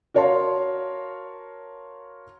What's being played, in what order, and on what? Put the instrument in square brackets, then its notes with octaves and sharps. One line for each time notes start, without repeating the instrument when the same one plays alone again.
[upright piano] F#4 A#4 C#5 F5 A5 C6